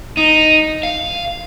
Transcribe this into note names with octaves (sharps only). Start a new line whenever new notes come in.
D#4
F5